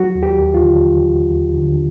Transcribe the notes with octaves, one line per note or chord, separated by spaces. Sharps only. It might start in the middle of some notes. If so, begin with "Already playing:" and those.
Already playing: F#3 F#4
D#2
G4
D#2
F4
D3
F#3
D#2
D#2
D3